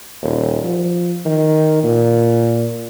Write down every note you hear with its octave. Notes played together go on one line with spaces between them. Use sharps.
D#1
F3
D#3
A#2